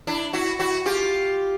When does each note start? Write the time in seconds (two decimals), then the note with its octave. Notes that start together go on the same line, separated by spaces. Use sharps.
0.07 D4 E4
0.33 E4 F#4
0.59 E4 F#4
0.86 F4 G4